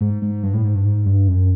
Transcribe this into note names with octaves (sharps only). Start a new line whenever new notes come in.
G#2
G#2
G2
A2
G#2
G2
G#2
G2
F#2